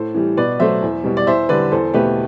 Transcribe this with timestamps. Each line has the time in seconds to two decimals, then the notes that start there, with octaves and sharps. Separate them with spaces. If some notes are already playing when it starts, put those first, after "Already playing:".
Already playing: A2 A4 C5
0.15 E3 G3
0.37 B2 B4 D5
0.60 F#3 A3 C5 E5
0.82 E2
1.04 B2 G3
1.17 D5
1.27 E2 C5 E5
1.49 D3 G3 B4 D5
1.72 E2 A4 C5
1.94 B2 A3 G4 B4